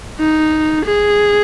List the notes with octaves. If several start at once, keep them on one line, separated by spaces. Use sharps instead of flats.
D#4
G#4